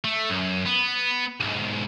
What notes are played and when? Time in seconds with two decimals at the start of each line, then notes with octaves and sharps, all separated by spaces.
0.04 A3
0.30 F#2
0.66 B3
1.40 B1 G#2